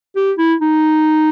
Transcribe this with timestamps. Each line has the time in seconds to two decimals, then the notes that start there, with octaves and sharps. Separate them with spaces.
0.16 G4
0.38 E4
0.61 D#4